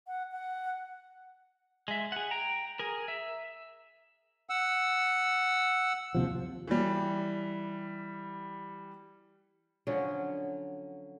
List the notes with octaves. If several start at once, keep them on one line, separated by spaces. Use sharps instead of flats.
F#5
F#5
G#3 E5
G#4 F#5
G5 A#5
G#4 A#4
E5
F#5 E6
D#2 C3 F3
E3 G3
D3 F3 F#3 C#4